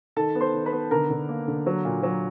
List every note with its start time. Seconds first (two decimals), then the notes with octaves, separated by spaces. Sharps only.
0.16 D#3 A4 A5
0.35 B3
0.41 C5 C6
0.54 D#3
0.66 B4 B5
0.72 B3
0.91 D3 A#4 A#5
1.10 D3
1.29 A#3
1.48 D3
1.66 F#3
1.85 A#2
2.03 F#3